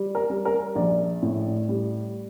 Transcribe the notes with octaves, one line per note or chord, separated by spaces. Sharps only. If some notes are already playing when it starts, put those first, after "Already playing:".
Already playing: G3
A#4
G3
A#4
A#1 D5
A2
G3